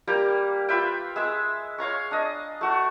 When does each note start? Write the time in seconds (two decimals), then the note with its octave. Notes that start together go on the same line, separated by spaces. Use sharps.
0.07 G3 A#3 G4 A#5
0.69 F4 B4 E5 G5
1.16 G#3 E5 E6
1.78 C#5 F5 A#5 C#6
2.11 D4 D#5
2.61 A3 F#4